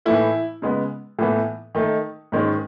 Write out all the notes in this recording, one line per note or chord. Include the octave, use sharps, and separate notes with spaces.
A2 E3 A3 E4
C#3 G#3 B3
A2 E3 B3
D#3 A3 D#4
G#2 D#3 G#3 C#4